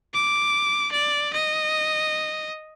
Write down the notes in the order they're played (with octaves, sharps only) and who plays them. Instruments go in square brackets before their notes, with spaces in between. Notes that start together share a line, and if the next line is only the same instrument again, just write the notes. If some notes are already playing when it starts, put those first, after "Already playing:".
[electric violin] D6
D5
D#5